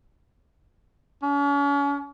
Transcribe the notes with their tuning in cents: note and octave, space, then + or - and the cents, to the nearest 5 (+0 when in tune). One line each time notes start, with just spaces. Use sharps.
C#4 +40